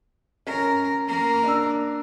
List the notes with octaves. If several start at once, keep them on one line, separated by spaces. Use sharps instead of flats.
C#4 A#4
A#3 A#4
D4 E6